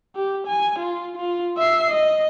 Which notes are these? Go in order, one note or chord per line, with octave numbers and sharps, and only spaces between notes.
G4
G#5
F4
F4
E5 C7
D#5